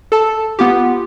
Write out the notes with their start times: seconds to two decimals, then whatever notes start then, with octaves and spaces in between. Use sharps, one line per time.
0.12 A4 A5
0.59 B3 F4 G4